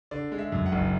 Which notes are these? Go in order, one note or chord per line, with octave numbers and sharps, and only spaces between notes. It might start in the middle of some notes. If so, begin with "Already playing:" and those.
D3 D5
G#3
E5
F#2
F#5
F#1